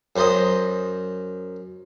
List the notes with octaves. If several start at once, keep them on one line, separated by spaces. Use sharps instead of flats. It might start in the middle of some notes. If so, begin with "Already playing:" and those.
F#2 C5 D#5